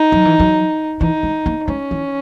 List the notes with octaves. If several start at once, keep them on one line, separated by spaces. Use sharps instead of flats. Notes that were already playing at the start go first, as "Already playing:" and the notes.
Already playing: D#4
F#3
E3
F#3
E3 D#4
G#3
A#3
G#3 C#4
E3